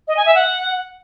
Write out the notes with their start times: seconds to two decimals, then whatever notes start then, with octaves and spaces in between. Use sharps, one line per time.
0.08 D#5
0.17 G#5
0.26 E5
0.35 F#5